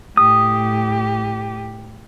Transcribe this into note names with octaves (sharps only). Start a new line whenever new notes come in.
A2 G4 D#6